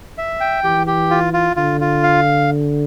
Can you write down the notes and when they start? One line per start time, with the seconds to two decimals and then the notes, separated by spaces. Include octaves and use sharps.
0.18 E5
0.41 G5
0.64 E3 G4
0.87 G4
1.11 F4
1.34 F4
1.57 D3 F4
1.81 F4
2.03 F5